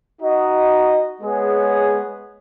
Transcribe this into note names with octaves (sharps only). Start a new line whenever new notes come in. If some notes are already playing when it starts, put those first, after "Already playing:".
D#4 F#4 D#5
G#3 B3 G#4 C#5